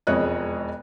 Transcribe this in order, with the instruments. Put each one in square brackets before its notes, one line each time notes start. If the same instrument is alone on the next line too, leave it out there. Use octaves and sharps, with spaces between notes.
[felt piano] E1 F2 G#3 C#5 D#5 F#6